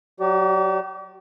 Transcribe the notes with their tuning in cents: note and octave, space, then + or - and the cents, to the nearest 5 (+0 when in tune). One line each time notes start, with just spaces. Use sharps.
F#3 +0 G4 -40 D5 +0